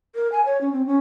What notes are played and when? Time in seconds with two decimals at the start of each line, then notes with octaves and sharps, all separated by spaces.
0.15 A#4
0.32 G#5
0.45 C#5
0.61 C#4
0.72 C4
0.87 C#4